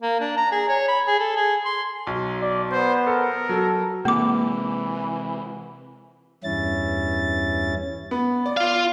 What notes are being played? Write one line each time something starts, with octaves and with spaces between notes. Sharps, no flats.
A#3
D4
A#5
G#4
C#5
B5
G#4
A4
G#4
C6
B1
D5
B3 C5
A4 A#4
F#3 A4
C3 E3 G#3 A#3 D6
E2 G2 C#4 E4 A6
B3
D5
F4 F5